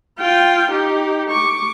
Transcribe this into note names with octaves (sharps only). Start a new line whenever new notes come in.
F4 G5
D#4 G4
C#6 D6